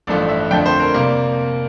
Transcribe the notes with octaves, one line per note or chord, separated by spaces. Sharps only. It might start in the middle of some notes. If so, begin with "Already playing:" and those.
A1 G2 F3 A3 D5
E5
F2 D3 F3 A3 G5
C5
A#4
C3 G3 A#3 A#4